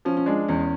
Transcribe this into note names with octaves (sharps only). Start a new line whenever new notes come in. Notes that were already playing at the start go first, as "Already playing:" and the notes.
F3 C#4
C#4
G#3 D4
E2 C#4